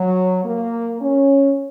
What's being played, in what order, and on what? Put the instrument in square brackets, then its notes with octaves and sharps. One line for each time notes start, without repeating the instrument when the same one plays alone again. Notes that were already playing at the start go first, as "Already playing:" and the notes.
Already playing: [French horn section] F#3
A#3
C#4